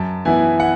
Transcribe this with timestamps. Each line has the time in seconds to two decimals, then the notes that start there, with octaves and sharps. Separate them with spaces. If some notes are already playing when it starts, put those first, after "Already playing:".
Already playing: F#2 A5
0.25 E3 B3 E4 G#5
0.60 F#5